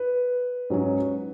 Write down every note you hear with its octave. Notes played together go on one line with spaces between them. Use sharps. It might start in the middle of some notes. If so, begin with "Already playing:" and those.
Already playing: B4
G#2 F#3 C#4